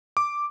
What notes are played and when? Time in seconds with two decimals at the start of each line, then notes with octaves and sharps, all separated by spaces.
0.17 D6